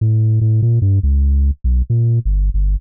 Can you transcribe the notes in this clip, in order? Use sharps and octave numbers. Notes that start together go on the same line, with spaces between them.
A2
A2
A#2
G2
C#2
B1
A#2
G1
G1